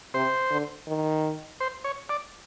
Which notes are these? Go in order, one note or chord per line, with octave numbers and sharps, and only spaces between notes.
C3 C5
D3
D#3
C5
C#5
D5